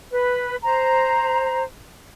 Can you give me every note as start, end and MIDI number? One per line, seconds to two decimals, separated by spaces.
0.11 0.55 71
0.63 1.62 72
0.63 1.62 82